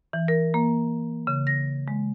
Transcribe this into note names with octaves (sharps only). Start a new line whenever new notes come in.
E3
A#4
A#3
C#3
A#6
G#3